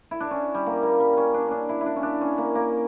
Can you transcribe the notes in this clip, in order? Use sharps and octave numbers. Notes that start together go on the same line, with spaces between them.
E4
D4
C#4
G3
A#3
A#3
G3
C#4
D4
C#4 D4
E4
E4
D4
C#4
D4
C#4
A#3
A#3